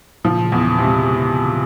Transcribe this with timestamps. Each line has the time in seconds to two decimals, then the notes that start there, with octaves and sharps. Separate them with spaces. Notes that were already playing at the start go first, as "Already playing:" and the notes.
0.24 A#2 C#3 F3
0.45 A#2 C#3
0.52 E2
0.65 A#2 C#3
0.78 C3
0.85 G#3 C4